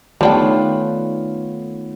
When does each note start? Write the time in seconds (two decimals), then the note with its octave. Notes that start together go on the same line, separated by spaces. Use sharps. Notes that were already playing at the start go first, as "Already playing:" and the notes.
0.21 D#3 G3 A3 B3 D4 F4 C#5 G5